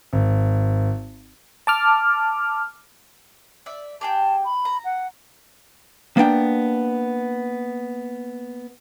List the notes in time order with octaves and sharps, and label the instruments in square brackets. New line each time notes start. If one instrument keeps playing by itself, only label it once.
[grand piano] G#1
[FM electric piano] A5 D6 F6
[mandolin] D5 E5
[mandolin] G4 G#4 G5 [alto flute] A5
[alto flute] B5
[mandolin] A#5
[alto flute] F#5
[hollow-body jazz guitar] A#3 B3 D4 G5